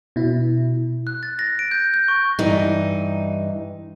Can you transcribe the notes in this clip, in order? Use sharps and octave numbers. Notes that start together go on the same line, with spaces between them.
B2 E4
F#6
A6
A#6
D7
G6
G6
C#6
G2 E3 D#4